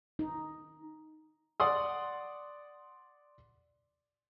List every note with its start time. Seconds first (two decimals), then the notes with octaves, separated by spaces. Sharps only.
0.19 D#4
1.60 D5 F#5 C6 D#6